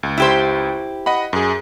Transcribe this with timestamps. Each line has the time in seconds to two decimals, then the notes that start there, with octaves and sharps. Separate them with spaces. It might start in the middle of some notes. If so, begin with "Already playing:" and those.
0.03 C#2
0.18 E4 G4 C5
1.06 D#5 F#5 B5
1.33 F#2 G#4